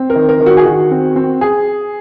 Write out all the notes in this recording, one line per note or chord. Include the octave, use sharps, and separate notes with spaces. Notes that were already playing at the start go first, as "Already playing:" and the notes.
Already playing: C4
A#4
D#3
A#4
D#3
F#4
G#4
D#3 F#4
C4
C4
G#4